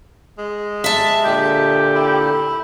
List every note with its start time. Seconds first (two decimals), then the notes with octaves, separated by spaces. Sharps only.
0.38 G#3
0.84 E5 A5
1.25 A#2 D3 G4
1.96 E4